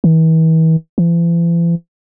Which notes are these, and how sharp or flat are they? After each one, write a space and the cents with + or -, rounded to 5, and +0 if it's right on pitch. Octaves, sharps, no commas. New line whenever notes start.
E3 -40
E3 +45